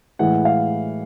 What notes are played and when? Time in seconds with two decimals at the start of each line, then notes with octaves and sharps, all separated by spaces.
0.19 A2 E3 G#3 F#5
0.45 F5